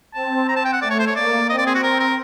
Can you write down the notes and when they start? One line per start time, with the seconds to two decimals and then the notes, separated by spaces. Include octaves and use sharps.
0.14 C4 A5
0.48 A#5
0.56 A5
0.65 G5
0.73 F#5
0.82 A3 D5
0.90 C#5
0.99 C5
1.07 C#5
1.16 A#3 D5
1.49 C4 D#5
1.58 D5
1.66 G#4
1.75 F#4
1.83 C4 A#4
2.00 A#4